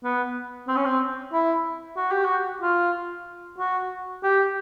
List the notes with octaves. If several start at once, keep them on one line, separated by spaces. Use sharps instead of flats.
B3
C4
C#4
C4
E4
F#4
G4
F#4
F4
F#4
G4